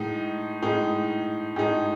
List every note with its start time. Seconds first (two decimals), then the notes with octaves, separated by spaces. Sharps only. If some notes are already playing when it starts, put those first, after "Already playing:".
Already playing: A2 G#3 D#4
0.62 A2 G#3 D#4
1.56 A2 G#3 D#4